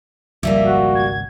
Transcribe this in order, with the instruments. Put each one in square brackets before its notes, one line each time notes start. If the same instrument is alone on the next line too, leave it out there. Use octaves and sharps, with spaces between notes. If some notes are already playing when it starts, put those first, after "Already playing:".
[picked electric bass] G#1 C#2 [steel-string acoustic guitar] F3 G3 A#3 [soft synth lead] E5
[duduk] F#4
[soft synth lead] G#6